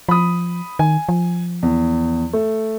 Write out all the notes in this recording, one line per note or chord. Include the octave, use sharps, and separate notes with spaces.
F3 B5 D#6
D#3 G#5
F3
E2
A3